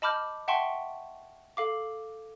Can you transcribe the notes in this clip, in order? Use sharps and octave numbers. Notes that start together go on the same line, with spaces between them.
D#5 A5 B5 D6 F6 G6
E5 F#5 G5 A5 C6 C#6
A4 F5 D6